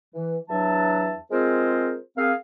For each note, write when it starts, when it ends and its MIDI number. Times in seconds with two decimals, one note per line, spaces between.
0.14 0.38 52
0.48 1.15 40
0.48 1.15 54
0.48 1.15 62
0.48 1.15 76
0.48 1.15 81
1.31 1.96 56
1.31 1.96 60
1.31 1.96 65
1.31 1.96 68
1.31 1.96 70
1.31 1.96 72
2.16 2.32 58
2.16 2.32 60
2.16 2.32 68
2.16 2.32 77